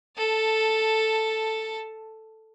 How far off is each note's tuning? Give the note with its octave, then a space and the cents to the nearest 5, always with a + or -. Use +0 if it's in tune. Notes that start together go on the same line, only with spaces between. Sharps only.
A4 +0 A5 +10